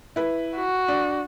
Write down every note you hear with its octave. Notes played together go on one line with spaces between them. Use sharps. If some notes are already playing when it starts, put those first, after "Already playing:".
E4 B4
F#4
D4